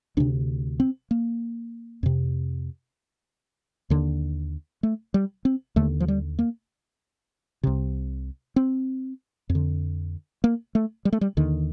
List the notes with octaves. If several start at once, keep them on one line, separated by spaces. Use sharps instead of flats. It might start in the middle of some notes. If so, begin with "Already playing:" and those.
D2 C3 D4
C4
A#3
F2 C3
D#2 D3
A3
G3
C4
D#2 D3 A3
F3
G3
A#3
C2 C3
C4
F2
D3
A#3
A3
G3
A3
G3
D#2 D3 D#3